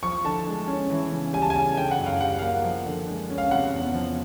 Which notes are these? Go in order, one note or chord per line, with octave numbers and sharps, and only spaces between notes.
F3 C#6
D3 A5
G#3
C#4
E3
C#3
G3 G#5
A5
C#3 G#5
D3 G5
F#5
F#2
F5
G3 F#5
F5
A#3 F#5
F3
D3
G#3
C#4
F5
C3 F#5
E2
F3